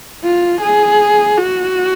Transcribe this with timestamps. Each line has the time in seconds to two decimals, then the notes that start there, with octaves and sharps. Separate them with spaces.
0.23 F4
0.61 G#4
1.37 F#4